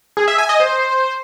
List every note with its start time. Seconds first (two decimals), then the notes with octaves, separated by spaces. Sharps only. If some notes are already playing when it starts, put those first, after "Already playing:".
0.17 G#4
0.28 E5
0.38 G#5
0.49 D#5
0.60 C5